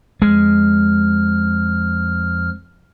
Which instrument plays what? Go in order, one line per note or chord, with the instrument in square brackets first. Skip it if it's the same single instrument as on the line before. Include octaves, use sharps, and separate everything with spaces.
[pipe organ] F2 F3 F6 [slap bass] G#3